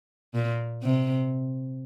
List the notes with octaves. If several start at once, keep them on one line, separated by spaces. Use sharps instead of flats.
A#2
C3